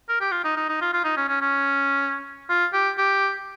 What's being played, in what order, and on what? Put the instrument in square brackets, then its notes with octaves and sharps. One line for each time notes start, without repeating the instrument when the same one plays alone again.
[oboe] A#4
G4
F4
D#4
D#4
D#4
F4
F4
D#4
C#4
C#4
C#4
F4
G4
G4